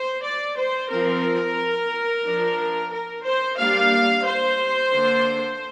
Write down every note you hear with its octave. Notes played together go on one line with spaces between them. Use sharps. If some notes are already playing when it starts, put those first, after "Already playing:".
Already playing: C5
D5
C5
F3 C4 A#4
F3 D4
A#4
C5
G3 A#3 D4 F5
C5
D3 A#3 D4